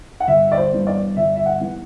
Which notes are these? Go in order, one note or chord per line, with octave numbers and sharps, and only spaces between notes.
F#5
G1 E5
D5
C5
G2 E3 B3
D5
G1 E5
E5
F#5
E3 B3